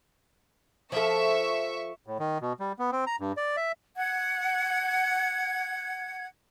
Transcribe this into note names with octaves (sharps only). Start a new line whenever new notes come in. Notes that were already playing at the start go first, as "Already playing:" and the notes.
F3 A4 E5 C#6
A2
D#3
B2
G3
B3
C4
A#5
G2
D5
E5
F#5 G#6